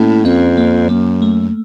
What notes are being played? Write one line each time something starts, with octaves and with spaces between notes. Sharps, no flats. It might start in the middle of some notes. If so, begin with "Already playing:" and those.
Already playing: A2 A#3 C#4
F2 C4
A#3
F#2 A#3
A3